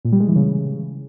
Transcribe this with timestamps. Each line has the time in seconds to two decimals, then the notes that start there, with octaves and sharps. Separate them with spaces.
0.05 A#2
0.12 G3
0.20 G#3
0.28 E3
0.36 C#3